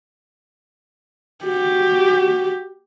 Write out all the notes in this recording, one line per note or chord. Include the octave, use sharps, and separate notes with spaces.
F#4 G4